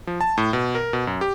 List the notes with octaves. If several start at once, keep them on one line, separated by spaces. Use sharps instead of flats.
F3
A5
A2
B2
A#4
B2
F#2
G4